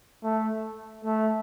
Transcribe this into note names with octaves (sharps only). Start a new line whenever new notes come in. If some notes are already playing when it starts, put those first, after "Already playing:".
A3
A3